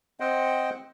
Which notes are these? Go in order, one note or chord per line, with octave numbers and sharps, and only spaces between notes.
C4 C5 D#5 F#5 G5